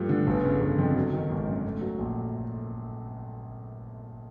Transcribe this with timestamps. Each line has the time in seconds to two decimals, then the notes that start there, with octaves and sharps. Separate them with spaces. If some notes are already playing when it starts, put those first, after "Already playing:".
Already playing: G2 F3 A3
0.09 D3
0.27 G1
0.44 C#3
0.61 G1
0.78 F2
0.96 F#3
1.13 D#3
1.30 G#1
1.47 F#2
1.65 A3
1.81 F#3
1.98 A#1